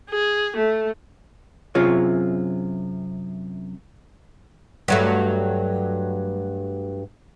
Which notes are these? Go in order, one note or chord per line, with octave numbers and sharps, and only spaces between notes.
G#4
A3
F#2 C3 F4 G#4 C#5
G2 F#3 A3